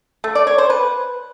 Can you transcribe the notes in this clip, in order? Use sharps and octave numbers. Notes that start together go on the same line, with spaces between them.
A3
D5
C#5
C5
B4